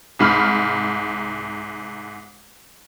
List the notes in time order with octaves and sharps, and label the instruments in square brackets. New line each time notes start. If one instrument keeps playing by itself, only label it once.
[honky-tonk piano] C2 G#2 B5 F6